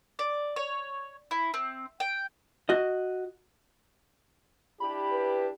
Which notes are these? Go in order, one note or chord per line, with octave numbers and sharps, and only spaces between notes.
D5
C#5
E4
C4
G5
F#4 D#5
D4 E4 G4 B5
B4